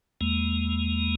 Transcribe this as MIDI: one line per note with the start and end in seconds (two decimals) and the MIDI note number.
0.21 1.15 40
0.21 1.15 56
0.21 1.15 58